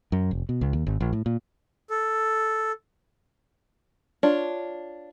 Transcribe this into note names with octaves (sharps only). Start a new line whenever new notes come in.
F#2
F1
B2
C#2
D#2
G#1
A#1
A2
A#2
A4
D4 F4 C#5